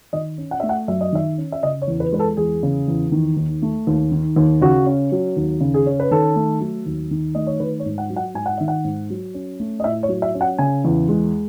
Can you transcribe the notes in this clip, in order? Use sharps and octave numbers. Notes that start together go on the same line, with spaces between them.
D#3 D#5
C#4
F#5
A3 E5
F#5
F#2 E5
D#5
D#3 E5
C#4
E5
C#3 D#5
C#5
E2
B4
G#3 B4
A4
E2 G#4
C#3
E2
D#3
D#2
A3
D#2
D#3
D#2
C#3 F#4
C#4
F#3
D#2
C#3
G#4
C#4
B4
D#3 A4
A3
F#3
D#2
D#3
A3 D#5
C#5
D#3 B4
C#5
G#2
F#5
F#3
F#5
G#2 G#5
F#5
D#3 E5
F#5
G#2
F#3
C#4
A3
D#5
A2 E5
C#5
F#3
E5
C#4
F#5
C#3 G#5
E2
G#3